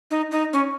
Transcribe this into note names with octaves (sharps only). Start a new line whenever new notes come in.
D#4
D#4
C#4